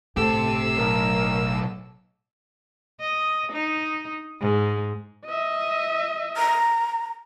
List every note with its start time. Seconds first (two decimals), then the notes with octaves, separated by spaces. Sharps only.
0.17 G1 A2 C3 G4 A4 E6
0.77 B1 A#4
3.00 D#5
3.52 D#4
4.41 G#2
5.26 D#5 E5
6.37 A#5